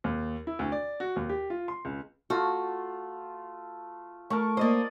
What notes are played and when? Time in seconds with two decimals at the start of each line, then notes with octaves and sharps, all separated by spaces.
0.04 D#2
0.47 E4
0.59 D2
0.72 D5
1.00 F#4
1.16 D#2
1.29 G4
1.50 F4
1.68 C6
1.85 C#2
2.30 A3 F4 F#4
4.30 A3 A#4 A5 C#6
4.57 A#3 C5 D5 D#5 D#6